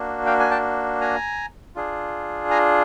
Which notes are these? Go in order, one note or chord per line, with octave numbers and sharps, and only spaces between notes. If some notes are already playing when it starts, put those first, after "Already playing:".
Already playing: A#3 D4 F#4
F5 G5
G#5
G5 A5
G#5 A#5
D4 F4 G#4
G#5 A#5